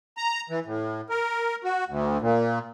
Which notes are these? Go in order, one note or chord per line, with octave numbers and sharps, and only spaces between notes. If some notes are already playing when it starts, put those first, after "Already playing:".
A#5
E3
A2
A#4
F#4
D2
A#2